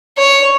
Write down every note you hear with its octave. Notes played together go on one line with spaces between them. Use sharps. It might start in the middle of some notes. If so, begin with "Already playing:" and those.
C#5